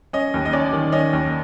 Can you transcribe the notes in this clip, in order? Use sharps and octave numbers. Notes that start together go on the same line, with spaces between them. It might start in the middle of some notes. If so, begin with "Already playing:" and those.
C#4 D#5
D#2
D#5
C#4 D5
D#3
C#4 D#5
D#2